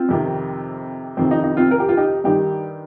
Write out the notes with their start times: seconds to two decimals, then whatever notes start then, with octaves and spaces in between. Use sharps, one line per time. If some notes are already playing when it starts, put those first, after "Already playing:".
Already playing: C4 F4
0.09 F2 C3 D#3
1.17 F2 C3 D#3 C4
1.31 D#4
1.44 D#4
1.57 C4 F4
1.71 A#4
1.80 G4
1.89 F4
1.97 D#4 G4
2.24 G2 D#3 D#4 G4